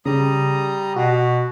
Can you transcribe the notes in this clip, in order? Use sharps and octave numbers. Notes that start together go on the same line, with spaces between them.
C#3 G3 A#5 D#6
B2 F#4